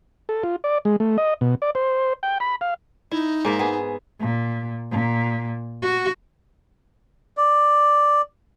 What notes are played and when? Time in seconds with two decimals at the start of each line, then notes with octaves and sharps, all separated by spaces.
0.29 A4
0.43 F4
0.64 D5
0.85 G#3
1.00 A3
1.18 D#5
1.41 B2
1.62 D5
1.75 C5
2.23 G5
2.40 B5
2.61 F5
3.11 D#4 E4
3.45 G#2 A#3 E5
3.59 B3 G#4
4.20 A#2
4.91 A#2
5.82 F#4
7.37 D5